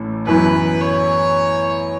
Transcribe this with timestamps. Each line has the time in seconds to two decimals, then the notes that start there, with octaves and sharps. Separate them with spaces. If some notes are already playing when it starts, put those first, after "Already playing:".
Already playing: A1 A2 A3 C#4
0.27 F#2 E3 B3 E4 B4
0.81 C#5